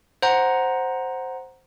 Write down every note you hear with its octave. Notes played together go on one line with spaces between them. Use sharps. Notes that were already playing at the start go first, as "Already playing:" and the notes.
C5 F#5 A#5